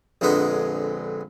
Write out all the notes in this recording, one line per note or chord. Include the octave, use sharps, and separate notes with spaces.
A#1 F2 D3 G#3 B3 A#5